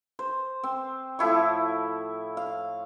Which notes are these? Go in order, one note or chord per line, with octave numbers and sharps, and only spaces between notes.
C5
C4
A2 F3 E4 C#6
F5